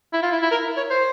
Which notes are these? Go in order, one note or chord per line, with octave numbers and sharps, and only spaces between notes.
E4
F4
E4
E4
A#4
C#5
C5